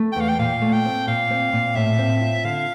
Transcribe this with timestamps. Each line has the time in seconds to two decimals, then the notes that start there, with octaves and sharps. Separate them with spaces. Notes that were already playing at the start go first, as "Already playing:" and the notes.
Already playing: A3
0.12 G5
0.16 E2 F5
0.29 G5
0.39 A#2 F5
0.61 A3
0.73 G5
0.85 C4
1.07 A#2 F5
1.30 C4
1.53 A#2
1.75 A2 E5
1.99 C4
2.21 F4
2.44 D3 F5